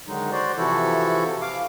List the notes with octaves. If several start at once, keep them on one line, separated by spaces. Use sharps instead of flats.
D3 D#3 F#3 G#3 D#4
F#4 C5 D5
C3 E3 F3 E4 F#4 A4
F5 D6